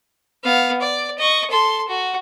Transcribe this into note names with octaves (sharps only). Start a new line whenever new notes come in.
B3 F5
D5
D#5 C#6
A4 C6
F#4